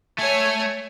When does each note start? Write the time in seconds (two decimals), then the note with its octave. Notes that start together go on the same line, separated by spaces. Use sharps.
0.18 A3 C#5 G#5